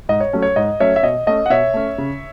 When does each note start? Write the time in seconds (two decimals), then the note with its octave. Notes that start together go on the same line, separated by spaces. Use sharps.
0.09 G#2 D#5
0.20 C#5
0.33 F#3 A3 C#4
0.42 C#5
0.56 G#2 D#5
0.80 F#3 A3 C#4 C#5 E5
0.96 E5
1.03 B2 D#5
1.27 A3 C#4 D#5
1.46 F#5
1.50 B2 C#5 E5
1.74 A3 C#4
1.98 C#3